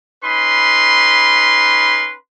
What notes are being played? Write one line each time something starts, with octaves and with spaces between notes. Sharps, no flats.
C#4 D#4 B4 B5 C6